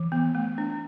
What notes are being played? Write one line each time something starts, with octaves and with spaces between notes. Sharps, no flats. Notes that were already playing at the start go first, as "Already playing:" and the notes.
Already playing: E3
B3
A3
D4